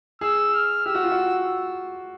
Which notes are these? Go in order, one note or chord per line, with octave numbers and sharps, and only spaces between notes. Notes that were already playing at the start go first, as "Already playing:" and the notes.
G#4 E6
F6
G4 E6
F#4
F4
F#4